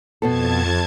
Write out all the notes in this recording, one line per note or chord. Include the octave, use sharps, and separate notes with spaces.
F2 B2 B3 A4 A5 G#6